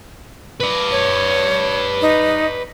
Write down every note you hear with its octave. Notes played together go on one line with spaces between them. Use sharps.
B4 D5
C#5
D#4